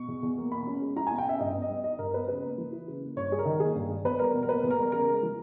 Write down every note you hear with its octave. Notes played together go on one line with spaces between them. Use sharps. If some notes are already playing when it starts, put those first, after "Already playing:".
Already playing: B2 C#6
E2
E2
A#3
B2 B5
C#4
G#3
E4 A#5
G#5
B2
G5
C#4 E5
G2 D#5
B3
D#5
G3
D#4 D#5
G2 A#4
B3 B4
C#3 B4
A#3
E3
E4
C#3
A#3
G2 C#5
G3 G#4
A#4
D#3
A#3 G#4
G2
G3
E2 B4
G3 A#4
B2
A#4
A#3 B4
E2
A#4
G3
C#3 A#4
G#3
E3